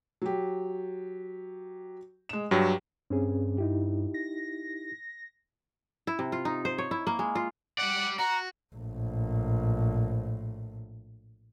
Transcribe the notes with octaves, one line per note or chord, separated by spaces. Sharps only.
F#3 G4
G#3 E7
G2 F#3 G4
G2 C4 C#4 G#4
D#4 E4 G4
A#6
E4
C3
F4
D#4
C5
C#5
E4
A#3
G#3
F4
G4 D5 F#5
F#4 F#5 A#5
A#1 A2